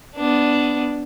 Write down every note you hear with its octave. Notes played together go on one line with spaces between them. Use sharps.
B3 D4